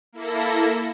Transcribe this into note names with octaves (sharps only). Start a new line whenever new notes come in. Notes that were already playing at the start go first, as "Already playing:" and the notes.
A#3 E4 A4 A#6